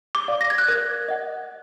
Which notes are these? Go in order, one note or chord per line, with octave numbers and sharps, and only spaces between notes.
D6
D5 F5
A#6
G#6
F#6
A#4 G#6
D#5 F#5